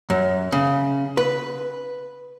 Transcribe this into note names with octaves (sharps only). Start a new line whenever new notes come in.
F#2
C#3
B4